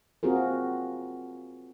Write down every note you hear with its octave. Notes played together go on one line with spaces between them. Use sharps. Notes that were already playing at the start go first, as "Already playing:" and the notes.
C4 F4 F#4 G#4 A#4